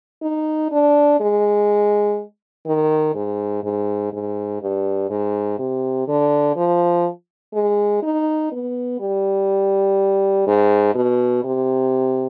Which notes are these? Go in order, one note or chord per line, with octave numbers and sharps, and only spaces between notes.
D#4
D4
G#3
D#3
G#2
G#2
G#2
G2
G#2
C3
D3
F3
G#3
D#4
B3
G3
G#2
B2
C3